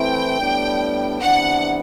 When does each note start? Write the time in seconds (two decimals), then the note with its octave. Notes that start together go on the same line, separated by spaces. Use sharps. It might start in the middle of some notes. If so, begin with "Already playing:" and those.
Already playing: E3 A3 C4 E4 G5
0.39 A2 G3 B3 D4
1.21 C3 E3 B3 D4 F#5